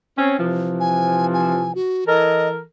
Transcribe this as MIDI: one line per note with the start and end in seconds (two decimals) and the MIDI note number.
0.18 0.37 60
0.18 0.37 61
0.40 1.82 48
0.40 1.82 52
0.40 1.82 53
0.80 1.26 80
1.34 1.72 80
1.75 2.04 66
2.08 2.61 52
2.08 2.61 69
2.08 2.61 70
2.08 2.48 75